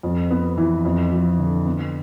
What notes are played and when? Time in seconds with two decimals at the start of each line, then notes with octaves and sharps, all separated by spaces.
0.03 F2
0.30 B3
0.57 E3
0.85 F2
1.12 F3
1.39 D3
1.66 B3